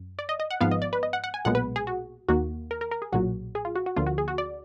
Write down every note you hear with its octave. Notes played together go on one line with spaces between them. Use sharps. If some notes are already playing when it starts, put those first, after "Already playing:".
Already playing: F#2
D5
D#5
D#5
F#5
G#1 G#2 F3 B3 F5
D#5
D5
B4
D#5
F#5
F#5
G#5
B1 A#2 G#3 B3 F#5
B4
G#4
F#4
D#2 D#3 A#3 F#4
A#4
A#4
A#4
G#4
B1 A#2 F#3 F#4
G#4
F4
F#4
F#4
D2 D3 F3 A#3 F4
F#4
G#4
F#4
D5